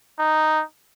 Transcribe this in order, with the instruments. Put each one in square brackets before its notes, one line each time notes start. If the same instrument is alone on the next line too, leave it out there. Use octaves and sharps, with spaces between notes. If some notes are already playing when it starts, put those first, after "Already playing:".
[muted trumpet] D#4